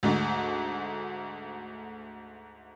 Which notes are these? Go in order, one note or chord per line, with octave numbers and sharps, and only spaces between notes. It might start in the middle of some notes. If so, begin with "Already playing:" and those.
D2 G#2 A3